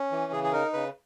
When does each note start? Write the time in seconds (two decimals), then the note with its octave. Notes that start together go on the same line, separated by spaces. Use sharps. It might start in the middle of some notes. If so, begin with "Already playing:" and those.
Already playing: C#4
0.12 E3
0.32 C#3 G#4
0.44 G#4
0.52 D#4 A#4
0.73 C#3 B4